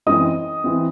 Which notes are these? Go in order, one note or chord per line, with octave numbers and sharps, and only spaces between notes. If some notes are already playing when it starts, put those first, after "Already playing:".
F#2 E3 C4 D#5 D#6
E3 C4